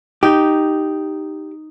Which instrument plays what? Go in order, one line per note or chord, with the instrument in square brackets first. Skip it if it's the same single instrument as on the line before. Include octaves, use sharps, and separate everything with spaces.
[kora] D#4 [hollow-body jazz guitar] G4